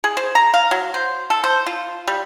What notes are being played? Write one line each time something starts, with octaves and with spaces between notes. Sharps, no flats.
G#4
C5
A#5
F5
F#3
C5
A4
C5
F4
G3